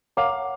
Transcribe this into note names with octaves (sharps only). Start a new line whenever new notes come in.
A#4 C#5 F5 F#5 A#5 D6